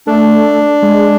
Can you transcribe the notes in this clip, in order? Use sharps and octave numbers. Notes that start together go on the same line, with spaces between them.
A3 D4
G#3